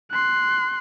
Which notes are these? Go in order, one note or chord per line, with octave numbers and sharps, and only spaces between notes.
C6 F#6